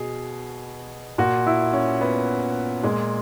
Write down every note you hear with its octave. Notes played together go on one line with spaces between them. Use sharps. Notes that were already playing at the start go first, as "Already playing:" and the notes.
Already playing: B2 G#4
A#2 F#4
E4
C#4
B3
A#2 G#3